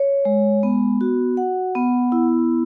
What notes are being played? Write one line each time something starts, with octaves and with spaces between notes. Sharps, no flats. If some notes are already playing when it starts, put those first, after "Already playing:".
Already playing: C#5
G#3
B3
F#4
F#5
B3
E4